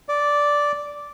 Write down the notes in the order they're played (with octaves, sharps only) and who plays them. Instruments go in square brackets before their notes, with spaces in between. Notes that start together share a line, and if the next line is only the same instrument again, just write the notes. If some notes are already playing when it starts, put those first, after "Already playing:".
[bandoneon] D5